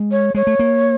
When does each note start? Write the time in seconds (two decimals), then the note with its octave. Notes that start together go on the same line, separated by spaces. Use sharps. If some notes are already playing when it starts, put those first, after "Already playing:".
Already playing: G#3
0.12 C#5
0.35 G#3 C#5
0.47 A3
0.59 A#3